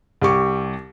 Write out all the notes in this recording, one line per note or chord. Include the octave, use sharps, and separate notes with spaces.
C2 G4 C#6 D6